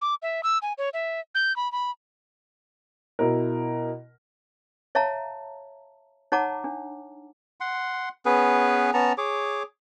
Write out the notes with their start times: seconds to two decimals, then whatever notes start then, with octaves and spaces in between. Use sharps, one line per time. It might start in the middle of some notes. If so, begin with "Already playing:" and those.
0.02 D6
0.22 E5
0.43 E6
0.62 G#5
0.78 C#5
0.93 E5
1.35 G6
1.56 B5
1.72 B5
3.19 B2 E4 A#4
4.95 C#5 E5 F5 A5 A#5
6.32 D#4 C#5 F#5 A5 A#5 D6
6.64 D4
7.60 F#5 C6
8.25 B3 C#4 G#4 B4
8.94 B3 C#4 A5 A#5
9.18 G#4 C#5 D6